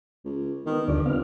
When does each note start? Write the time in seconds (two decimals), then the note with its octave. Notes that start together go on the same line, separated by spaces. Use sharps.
0.25 C#2
0.66 D#3 B3
0.88 G1 D2 D3 D5
1.06 B3 C4 F5